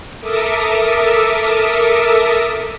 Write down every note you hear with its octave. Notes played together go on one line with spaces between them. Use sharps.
A4 A#4 E5 D6 D#6